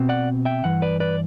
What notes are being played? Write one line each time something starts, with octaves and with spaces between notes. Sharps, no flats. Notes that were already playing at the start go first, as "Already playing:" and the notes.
Already playing: B2 C4
D5 F#5
E5 G5
G2 E3 F#5
B4 D5
B4 D5